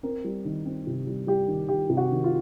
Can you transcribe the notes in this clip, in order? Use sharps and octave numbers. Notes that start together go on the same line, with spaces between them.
C4 A#4
G3
D#3
C4
C3
G3
G3 G4
D#3
D#3 G4
C3
F#4
D#3
F4